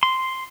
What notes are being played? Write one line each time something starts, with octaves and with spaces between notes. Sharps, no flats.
C6